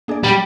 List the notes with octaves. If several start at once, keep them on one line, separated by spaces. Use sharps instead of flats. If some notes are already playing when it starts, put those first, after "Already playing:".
A#3 D4 G#4 D5
A#2 G3